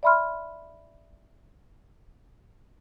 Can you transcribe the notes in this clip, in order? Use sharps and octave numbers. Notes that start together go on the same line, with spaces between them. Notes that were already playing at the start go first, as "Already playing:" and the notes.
D5 E5 B5 C6 F6